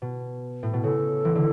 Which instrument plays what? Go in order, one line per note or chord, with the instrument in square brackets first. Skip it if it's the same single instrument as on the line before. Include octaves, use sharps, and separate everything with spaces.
[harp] B2
A2
B2
[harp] C#3 [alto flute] A4
[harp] E3
D3